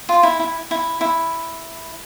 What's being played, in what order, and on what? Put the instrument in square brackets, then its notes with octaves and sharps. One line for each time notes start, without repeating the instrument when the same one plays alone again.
[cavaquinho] F4
E4
E4
E4
E4